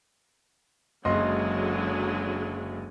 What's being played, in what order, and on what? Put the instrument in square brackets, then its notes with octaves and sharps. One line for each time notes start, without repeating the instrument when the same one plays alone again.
[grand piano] F#1 D#5 C6 [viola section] D3 F#3 G#3